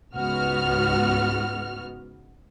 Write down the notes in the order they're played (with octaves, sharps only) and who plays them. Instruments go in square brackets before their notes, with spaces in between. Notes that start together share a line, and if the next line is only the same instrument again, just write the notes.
[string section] C#2 G#2 B3 F#4 F6